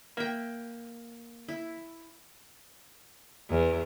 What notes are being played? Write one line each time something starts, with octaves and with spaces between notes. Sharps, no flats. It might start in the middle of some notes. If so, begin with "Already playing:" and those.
A#3 E5 G5
E4
E2